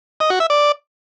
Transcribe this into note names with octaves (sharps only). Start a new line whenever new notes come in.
D#5
F#4
E5
D5